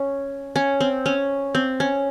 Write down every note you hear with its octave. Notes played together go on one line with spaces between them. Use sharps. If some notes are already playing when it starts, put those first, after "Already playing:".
Already playing: C#4
C#4
C4
C#4
C4
C#4